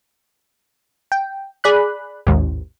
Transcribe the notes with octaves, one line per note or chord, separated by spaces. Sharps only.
G5
G#4 D5 B5 F#6
A1 D#2 G#2